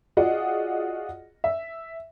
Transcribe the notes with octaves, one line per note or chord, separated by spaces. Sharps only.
F4 F#4 G#4 D5 D#5 F#5
E5